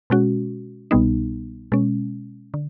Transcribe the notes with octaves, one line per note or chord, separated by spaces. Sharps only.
B2 G#3 C#4 F#4
C2 B2 G3 B3 D#4
B2 G#3 C#4
D3